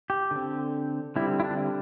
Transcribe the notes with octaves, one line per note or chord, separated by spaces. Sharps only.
G4
D3 C4
D3 G3 C4 E4
E4
D4